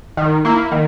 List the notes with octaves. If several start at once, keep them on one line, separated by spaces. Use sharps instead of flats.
D#3
A#3 E4
D#3